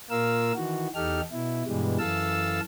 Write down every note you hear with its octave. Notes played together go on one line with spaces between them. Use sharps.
A#2 A#3 F4 A#4 F5 E6
D#3 E3 F#4
E2 D#4 G4 A4 F6
B2 E4
G2 B2 E3 G3 G#3
F#2 E3 A4 F5 A5 E6